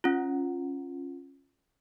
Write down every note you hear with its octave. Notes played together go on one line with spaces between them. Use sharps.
C#4 F4